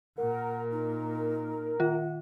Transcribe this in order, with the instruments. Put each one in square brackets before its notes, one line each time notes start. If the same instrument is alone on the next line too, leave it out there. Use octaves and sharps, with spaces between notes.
[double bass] A#2 [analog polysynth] A#4 [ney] F#5
[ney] D#4
[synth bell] D#3 F4 [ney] F#5